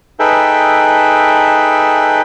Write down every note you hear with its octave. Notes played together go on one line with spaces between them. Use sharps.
D#4 G#4 A4 B4 E5 G5